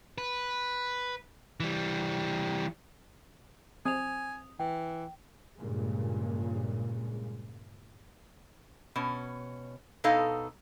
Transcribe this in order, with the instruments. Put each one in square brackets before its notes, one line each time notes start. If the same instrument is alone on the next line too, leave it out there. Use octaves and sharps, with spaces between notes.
[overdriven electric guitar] B4
E3 G3
[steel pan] C4 [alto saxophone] G#5 [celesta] D#6 F7
[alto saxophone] E3 [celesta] G5
[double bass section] G2 A#2 C#3 G#3
[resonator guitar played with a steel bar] B2 C#4
B2 D#4 A4 D#5 F5